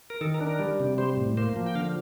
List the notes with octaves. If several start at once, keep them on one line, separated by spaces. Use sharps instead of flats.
A#4
D#3 A4
A#4
D4
A#4
G3
C3
G3 C5
A2
A#3 C5
F3
G5
D3 F5